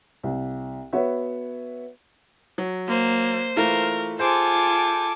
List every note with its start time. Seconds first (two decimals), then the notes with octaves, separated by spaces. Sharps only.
0.23 C2
0.93 B3 F#4 C#5 E5
2.58 F#3
2.88 A#3 C5
3.57 E3 A3 F4 A#4
4.19 F4 G#4 A4 C5 G#5 D6